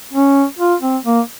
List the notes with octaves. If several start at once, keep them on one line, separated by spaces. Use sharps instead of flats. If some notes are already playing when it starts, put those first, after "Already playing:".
C#4
F4
C4
A#3